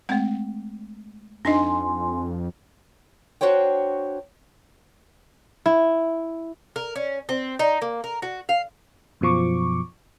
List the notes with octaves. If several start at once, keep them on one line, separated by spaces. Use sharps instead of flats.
G#3 A3 C4 F#5
F2 D4 D#4 D#5 G#5 C6
D4 F#4 C5 C#5 G5
E4
A#4
C#4
C4
D#4
A#3
A#4
F#4
F5
F#2 B2 F3 C#6 D6